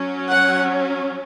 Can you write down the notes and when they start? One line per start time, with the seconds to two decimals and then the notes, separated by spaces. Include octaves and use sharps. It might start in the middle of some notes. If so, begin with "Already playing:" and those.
Already playing: F#3 C#4
0.29 F#5